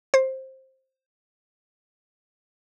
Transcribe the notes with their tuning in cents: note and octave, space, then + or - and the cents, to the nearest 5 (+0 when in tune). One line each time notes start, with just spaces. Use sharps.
C5 +15